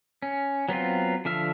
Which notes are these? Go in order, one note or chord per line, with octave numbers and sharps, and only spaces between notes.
C#4
F#3 B3 C4 F4
D3 F3 E5 F6